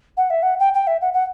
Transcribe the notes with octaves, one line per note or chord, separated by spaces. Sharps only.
F#5
E5
F#5
G5
G5
E5
F#5
F#5